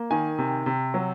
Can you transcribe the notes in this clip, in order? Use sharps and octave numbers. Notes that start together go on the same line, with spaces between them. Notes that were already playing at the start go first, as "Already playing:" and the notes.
Already playing: A#3
D#3 G#5
C3
C3
F#3